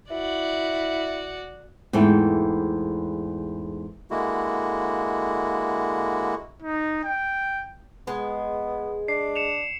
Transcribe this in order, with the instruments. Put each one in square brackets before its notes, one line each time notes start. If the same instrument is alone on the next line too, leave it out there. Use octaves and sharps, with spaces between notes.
[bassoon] E4 [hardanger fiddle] F#4 D5
[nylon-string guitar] E2 G#2 A3 G5
[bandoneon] D3 G#3 A#3 E4 F#4
[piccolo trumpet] D#4
G5
[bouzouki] G#3 [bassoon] B3
[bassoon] D4 [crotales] C7
[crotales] C#7 E7 F7